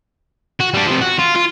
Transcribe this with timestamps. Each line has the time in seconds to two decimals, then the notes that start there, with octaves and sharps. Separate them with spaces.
0.60 F#4
0.74 G3 D4
0.86 C3 F3
1.01 F#4
1.19 F4
1.35 F4